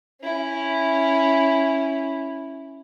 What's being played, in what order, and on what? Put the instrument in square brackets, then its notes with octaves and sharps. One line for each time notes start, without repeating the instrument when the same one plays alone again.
[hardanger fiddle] C#4 E4